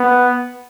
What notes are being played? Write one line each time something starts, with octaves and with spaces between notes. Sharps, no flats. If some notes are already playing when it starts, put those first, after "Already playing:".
Already playing: B3